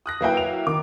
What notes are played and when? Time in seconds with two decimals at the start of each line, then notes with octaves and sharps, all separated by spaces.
0.06 D#6 F#6 A#6
0.21 F#3 A#3 E4 B4 G5
0.37 F7
0.67 D#3 D6